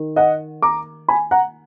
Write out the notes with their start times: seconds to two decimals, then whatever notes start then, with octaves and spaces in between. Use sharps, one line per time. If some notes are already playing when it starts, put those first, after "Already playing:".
Already playing: D#3 D#4
0.16 D#5 F#5
0.62 A#5 D6
1.08 G#5 B5
1.31 F#5 A#5